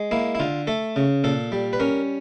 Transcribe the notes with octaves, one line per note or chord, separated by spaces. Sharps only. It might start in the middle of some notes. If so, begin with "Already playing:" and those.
Already playing: G#3
A#3 E4
E4
D3 F4
A3 A4
C#3
A#2 A4
G3
B4
C#4 A#4